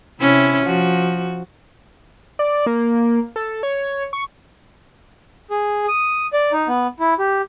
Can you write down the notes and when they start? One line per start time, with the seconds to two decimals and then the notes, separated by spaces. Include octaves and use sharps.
0.19 C3 C#4 E4
0.64 F3 F#4
2.39 D5
2.66 A#3
3.36 A4
3.63 C#5
4.13 C#6
5.50 G#4
5.88 D#6
6.33 D5
6.52 D#4
6.68 B3
7.00 E4
7.19 G4